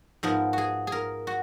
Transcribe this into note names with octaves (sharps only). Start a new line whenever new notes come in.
G#2 F3 G#3 B3 A#4
F#4 G#4
G#4 A#4
F#4